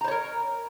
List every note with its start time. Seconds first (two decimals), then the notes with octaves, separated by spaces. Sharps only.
0.01 A#5
0.04 C5
0.08 C#5
0.11 A#4